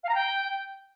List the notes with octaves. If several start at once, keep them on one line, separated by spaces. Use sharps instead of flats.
F5
A#5
G5